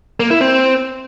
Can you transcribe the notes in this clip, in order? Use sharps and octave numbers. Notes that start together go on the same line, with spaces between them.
A#3
E4
C4